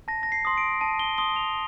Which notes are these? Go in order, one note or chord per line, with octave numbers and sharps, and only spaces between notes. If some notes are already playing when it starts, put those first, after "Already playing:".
A5 A#6
A#6
C7
C6 D#6
D7
A5 D#7
G7
C6 D#6 G7
F7